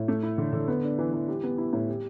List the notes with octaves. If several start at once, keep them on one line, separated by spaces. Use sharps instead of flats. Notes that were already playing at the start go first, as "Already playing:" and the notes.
Already playing: A2
A3
E4
D3
D3
B3
D4
E3
E3
G3
B3
E4
A2
G3